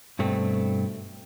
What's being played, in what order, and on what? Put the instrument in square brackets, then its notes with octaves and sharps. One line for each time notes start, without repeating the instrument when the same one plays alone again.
[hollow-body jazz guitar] G2 B2 A3 C4